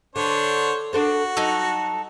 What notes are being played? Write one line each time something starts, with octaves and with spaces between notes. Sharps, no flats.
D3 D4 C5 C#5
D4 F#4 A4 C5
F#3 D#4 A4